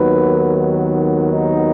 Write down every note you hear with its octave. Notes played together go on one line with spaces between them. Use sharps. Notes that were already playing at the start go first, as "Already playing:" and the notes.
Already playing: D#2 D#3 F#3 B3 B4
D#4